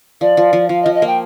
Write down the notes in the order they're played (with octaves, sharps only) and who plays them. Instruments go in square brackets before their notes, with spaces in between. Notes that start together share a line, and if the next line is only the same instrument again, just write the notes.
[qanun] F3 [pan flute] D5
[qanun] F3
F3
[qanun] F3 [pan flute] F5
[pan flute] D#5
[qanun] F3
[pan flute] D#5
[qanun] A#3 [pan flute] G5